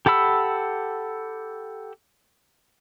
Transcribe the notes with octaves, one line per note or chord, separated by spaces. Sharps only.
G4 A4 F#5 B5 E6